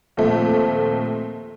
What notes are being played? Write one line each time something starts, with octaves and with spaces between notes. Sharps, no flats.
D#2 A#2 F3 A3 C4